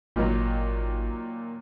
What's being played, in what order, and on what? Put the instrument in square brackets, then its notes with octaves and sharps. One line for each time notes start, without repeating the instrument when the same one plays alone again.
[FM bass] G#1 [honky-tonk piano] A#2 D#3 F#3